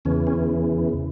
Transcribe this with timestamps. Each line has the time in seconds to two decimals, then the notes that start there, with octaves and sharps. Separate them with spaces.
0.05 E2 C#3 E3 C#4
0.27 C#4